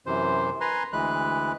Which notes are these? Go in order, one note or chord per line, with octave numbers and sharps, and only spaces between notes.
F#2 C3 E3 C5
B4 G#5 A#5 C6
D2 E3 G#3 B4 F#6